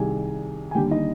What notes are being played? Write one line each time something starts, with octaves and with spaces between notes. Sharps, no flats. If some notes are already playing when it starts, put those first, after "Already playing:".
Already playing: C2 C3 D#3 G3 G#4 G#5
G#5
D#2 D3 G3 G4 G5
D#4 D#5